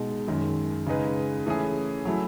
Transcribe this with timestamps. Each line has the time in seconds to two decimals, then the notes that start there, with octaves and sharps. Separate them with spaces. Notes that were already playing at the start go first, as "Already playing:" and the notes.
Already playing: B2 G#3 D#4
0.28 F#2 D#3 G#3
0.87 C#3 G#3 D#4 G#4 B4
1.46 E3 A3 C#4 G#4
2.05 F#3 A3 E4